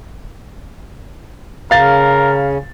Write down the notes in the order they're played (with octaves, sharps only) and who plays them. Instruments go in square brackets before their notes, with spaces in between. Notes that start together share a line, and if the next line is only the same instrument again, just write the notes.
[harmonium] C#3 [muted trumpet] A#4 [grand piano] F5 A6